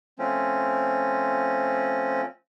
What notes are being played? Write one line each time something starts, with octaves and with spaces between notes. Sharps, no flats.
F3 A3 C4 C#4